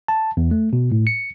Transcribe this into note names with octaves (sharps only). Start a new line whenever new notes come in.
A5
E2
A3
B2
A2
C#7